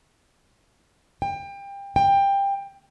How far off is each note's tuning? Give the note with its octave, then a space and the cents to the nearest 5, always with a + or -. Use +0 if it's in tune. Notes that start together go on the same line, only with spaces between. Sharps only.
G5 +25
G5 +20